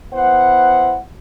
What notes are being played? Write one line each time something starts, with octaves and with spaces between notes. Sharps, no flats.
B3 E4 C5 F#5